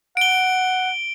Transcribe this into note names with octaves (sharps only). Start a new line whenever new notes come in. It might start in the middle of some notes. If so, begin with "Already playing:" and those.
F#5 D7 G7